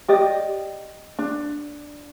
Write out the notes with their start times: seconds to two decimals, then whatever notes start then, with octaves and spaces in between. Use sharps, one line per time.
0.08 G4 D5 D#5
1.19 D4